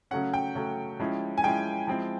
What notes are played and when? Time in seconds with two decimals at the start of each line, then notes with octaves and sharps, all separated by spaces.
0.11 C#3 F#3 A3 C#4 F#5
0.34 G5
0.55 C#3 F#3 A3 C#4
1.00 F3 G#3 C#4 E4
1.38 G#5
1.43 F3 G#3 C#4 E4 G5
1.87 F3 G#3 C4 E4